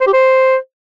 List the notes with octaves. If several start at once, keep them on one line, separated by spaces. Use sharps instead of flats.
C5
G4
C5